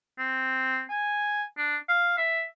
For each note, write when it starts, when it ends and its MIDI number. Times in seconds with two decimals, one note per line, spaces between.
0.18 0.82 60
0.90 1.43 80
1.58 1.77 62
1.89 2.14 77
2.18 2.44 76